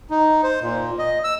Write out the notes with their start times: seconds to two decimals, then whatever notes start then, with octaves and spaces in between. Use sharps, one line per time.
0.10 D#4
0.43 C5
0.61 A#2
0.98 D#5
1.24 E6